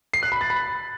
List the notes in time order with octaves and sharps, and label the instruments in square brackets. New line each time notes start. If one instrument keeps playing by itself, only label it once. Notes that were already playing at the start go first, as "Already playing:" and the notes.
[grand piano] C7
F#6
B5
A6
B5